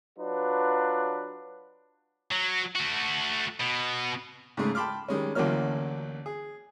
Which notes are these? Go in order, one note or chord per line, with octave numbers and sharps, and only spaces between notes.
F#3 D4 F4 B4
F#3
A3 F#4
B2
G#2 C#3 G#3 A3
G5 A5 B5 C6 D6 F6
D#3 G3 G#3 C#4
A1 D2 F#3 A#3 C#4 F6
G#4